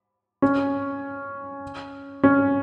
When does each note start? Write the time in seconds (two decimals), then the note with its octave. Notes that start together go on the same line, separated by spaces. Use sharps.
0.42 C#4
2.23 C#4